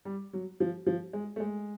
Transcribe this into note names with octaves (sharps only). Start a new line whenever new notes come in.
G3
F#3
F3
F3
G#3
A3
G#3